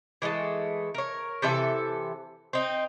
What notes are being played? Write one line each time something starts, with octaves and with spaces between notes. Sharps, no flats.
E3 G#3 A3 A5
A#4 C#5
C3 E3 A4 E5
C4 D#4